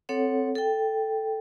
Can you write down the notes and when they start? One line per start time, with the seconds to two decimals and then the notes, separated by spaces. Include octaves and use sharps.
0.09 C4 A4 C#5 F#5
0.55 A4 G5